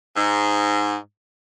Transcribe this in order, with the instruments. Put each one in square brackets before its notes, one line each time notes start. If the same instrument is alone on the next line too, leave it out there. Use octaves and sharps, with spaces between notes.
[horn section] G#2